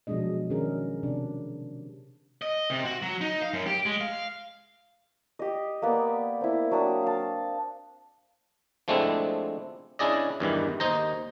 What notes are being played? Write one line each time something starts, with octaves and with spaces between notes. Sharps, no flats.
B2 F3 F#3 G#3 D4 D#5
D#3 C#4 D4 G#4 A#4
C3 D4
D#5
C3
F#4
F#3
D#4
F5
F#2
G4
G#3
F5
G4 D#5
A#3 B3 D5
C4 E4
F#3 D4 G5 D#6
F5 A5
F3 G#3 A3 C4 D4 E4
C#4 D4 E4 G#4 D5 D#5
E2 G2 D#3 E3
D#2 D#4 C5 A#5